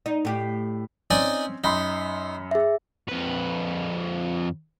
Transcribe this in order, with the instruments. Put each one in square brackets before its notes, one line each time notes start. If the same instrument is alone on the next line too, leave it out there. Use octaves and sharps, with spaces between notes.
[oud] D#4
A2 G4
[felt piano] C4 C#4 [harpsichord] D#4 D5 G#5
[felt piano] F#2 B5 C6 [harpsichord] D#4
[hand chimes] G#4 E5
[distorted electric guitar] F2 B4